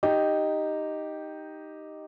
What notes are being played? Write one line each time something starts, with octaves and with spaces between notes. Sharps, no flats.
D#4 G4